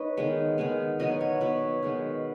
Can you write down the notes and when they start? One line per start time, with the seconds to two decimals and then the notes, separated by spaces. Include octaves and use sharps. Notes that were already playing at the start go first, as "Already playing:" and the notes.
Already playing: D#4 B4 C#5 D#5
0.17 D#3 G#3 B3
0.58 D#3 G#3 B3
0.99 B2 F#3 B3 D#5
1.21 C#5
1.41 B2 F#3 B3 C#5
1.83 D#3 G#3 B3